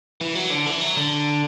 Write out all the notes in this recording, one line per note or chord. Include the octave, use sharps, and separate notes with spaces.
E3
F#3
D3
E3
F#3
D3